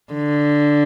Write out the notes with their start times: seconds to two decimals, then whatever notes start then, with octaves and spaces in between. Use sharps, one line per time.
0.13 D3